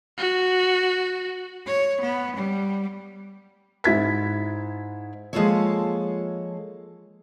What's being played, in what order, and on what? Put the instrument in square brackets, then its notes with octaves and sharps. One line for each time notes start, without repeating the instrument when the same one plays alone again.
[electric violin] F#4
[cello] C#5
B3
G3
[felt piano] G#2 E4 G#6 B6
[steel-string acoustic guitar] F3 G#3 A#3 F4 A4 C#5